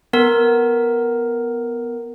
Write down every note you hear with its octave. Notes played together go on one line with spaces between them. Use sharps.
B3 A#4